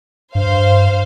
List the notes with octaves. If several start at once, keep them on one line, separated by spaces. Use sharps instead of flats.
G2 C5 F5